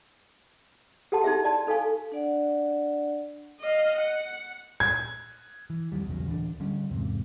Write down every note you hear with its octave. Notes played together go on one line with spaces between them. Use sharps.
G4 A4 F#5 A5 C6
D#4 E4 G4 G#4 E5
D5 A5 C6
D#4 A4 F5 G#5 C#6
D4 D5 F#5
D#5 F5
F#5
G#6
E3
F2 G#2 D#3 G3
A#1 E2 C#3 F#3
D1 E3 C#4 D4
D3 G3 C#4
E2 G#2 C3